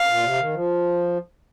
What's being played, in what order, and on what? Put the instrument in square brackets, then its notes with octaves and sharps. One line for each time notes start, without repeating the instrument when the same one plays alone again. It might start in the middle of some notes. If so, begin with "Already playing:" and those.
Already playing: [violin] F5
[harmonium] A#2
C3
D#3
F3